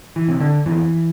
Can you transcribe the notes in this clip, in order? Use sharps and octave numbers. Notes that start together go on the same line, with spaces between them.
E3
C3
D3
F2 E3